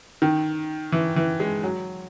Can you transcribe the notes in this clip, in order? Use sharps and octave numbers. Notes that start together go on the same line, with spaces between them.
D#3
E3
E3
G#3
F#3